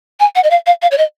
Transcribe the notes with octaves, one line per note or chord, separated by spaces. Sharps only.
G#5
F#5
D#5
F5
F5
F5
C#5
D#5